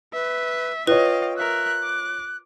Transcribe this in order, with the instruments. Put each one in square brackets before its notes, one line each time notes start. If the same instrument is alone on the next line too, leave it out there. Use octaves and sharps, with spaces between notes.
[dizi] B4 [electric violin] E5
[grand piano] F4 C#5 [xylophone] B4 [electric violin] D#5 F5 [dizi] G5
[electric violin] A#4 E5 [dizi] F#6
[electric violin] D6